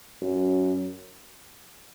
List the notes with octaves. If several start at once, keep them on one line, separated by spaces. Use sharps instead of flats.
F#2